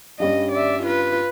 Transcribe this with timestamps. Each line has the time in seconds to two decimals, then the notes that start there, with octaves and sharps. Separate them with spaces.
0.20 G2 G3 C#4 D#5
0.53 D5 E5
0.83 F4 B4